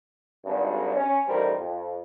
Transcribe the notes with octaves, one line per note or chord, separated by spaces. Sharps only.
G#1 G2
C#4
A1 A2 D#3 G3 A#4 C5
F2